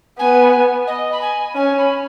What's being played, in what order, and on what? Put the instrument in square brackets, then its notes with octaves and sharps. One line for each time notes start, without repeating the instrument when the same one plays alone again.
[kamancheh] B3 [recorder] G#5
[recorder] D#5
B5
G#5
[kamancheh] C#4 [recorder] G#5
[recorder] B5